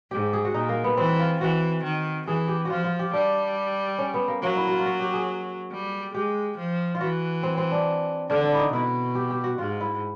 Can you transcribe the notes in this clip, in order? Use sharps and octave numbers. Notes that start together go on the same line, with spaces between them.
G#2 G4
G#4
F#4
A#2 D#4
A#3
B3
E3 C4
F4
E3 F#4
D#3
E3 G#4
G4
F3 F4 F#4
F4
G4
G3 D4
C#4
B3
A#3
F#3 A#3
E4
F4 F#4
F4
F#4
G4
G#4
G3
G#3 G4
F3
F4
E3 F#4
C4
C4
D4
D3 D4
D4
E4
D#4
B2 E4
G4
G4
F#4
G#2 F4
E4